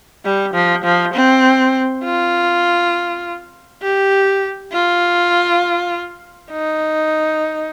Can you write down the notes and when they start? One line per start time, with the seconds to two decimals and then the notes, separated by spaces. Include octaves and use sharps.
0.25 G3
0.54 F3
0.84 F3
1.14 C4
2.04 F4
3.82 G4
4.72 F4
6.51 D#4